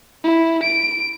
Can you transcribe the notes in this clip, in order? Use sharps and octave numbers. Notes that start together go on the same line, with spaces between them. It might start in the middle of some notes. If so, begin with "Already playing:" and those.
E4
D7